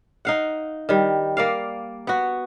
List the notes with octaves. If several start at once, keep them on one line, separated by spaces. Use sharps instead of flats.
D#4 F5 F#5
D#3 G3
A#3 D5 F5
B3 F#4